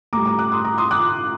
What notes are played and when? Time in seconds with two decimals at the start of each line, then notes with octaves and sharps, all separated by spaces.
0.13 A2 A#5 D6
0.16 G3
0.25 A#5 D6
0.39 D6 F#6
0.52 C6 D#6
0.64 A#5 D6
0.78 C6 D#6
0.91 D6 F#6